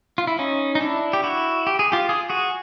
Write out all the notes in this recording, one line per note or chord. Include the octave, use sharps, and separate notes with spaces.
F4
E4
C#4 D#4
D#4
D4 E4
G4
E4 F#4
G4
G#4
F4 G4
G#4
F#4 G#4